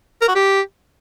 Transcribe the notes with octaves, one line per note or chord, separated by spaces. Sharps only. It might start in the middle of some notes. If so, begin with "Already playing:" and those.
A#4
F#4
G4